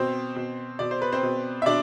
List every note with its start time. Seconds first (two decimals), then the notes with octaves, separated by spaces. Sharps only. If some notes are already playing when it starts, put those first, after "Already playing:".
Already playing: B2 C4 C5
0.36 B2
0.79 B2 D5
0.91 C5
1.02 B4
1.12 C4 C5
1.23 B2
1.62 E5
1.66 B2 D4 D5